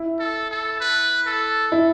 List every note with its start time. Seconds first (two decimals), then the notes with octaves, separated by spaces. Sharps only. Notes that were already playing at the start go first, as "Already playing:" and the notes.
Already playing: E4
0.20 A4
0.51 A4
0.81 B4
1.27 A4
1.72 E4